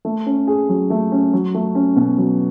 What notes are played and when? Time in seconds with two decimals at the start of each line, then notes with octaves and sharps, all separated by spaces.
0.05 A3
0.26 C#4
0.47 G#4
0.69 F#3
0.90 A3
1.12 C#4
1.33 F#3
1.55 A3
1.75 C#4
1.96 B2
2.18 F#3